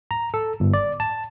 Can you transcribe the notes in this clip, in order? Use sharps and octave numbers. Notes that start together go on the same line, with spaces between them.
A#5
A4
G1
D5
A5